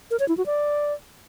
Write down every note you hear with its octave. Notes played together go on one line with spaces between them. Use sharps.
A#4
C#5
E4
F#4
D5